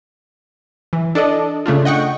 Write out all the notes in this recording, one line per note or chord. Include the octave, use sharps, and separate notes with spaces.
E3
D4 A4 D5 D#5
C#3 A3 D4 F4
D#5 F#5 G5 C#6